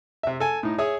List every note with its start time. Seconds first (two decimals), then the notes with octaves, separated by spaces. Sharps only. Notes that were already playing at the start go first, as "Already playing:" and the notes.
0.23 C3 E5
0.40 A4 G#5
0.63 A2 D#4
0.78 G#4 C#5 E5 D#6